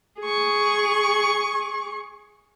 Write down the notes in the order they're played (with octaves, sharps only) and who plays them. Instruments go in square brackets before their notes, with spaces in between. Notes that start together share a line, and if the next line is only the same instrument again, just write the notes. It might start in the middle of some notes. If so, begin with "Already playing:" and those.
[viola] G#4 C#6